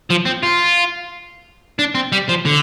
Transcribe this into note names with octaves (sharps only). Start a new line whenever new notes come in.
F3
C4
F4
D4
C4
G3
F3
D3